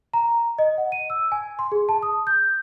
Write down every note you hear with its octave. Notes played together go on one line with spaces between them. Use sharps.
A#5
D#5
F#5
D#7
E6
G#5
C6
G#4
A5
D#6
G6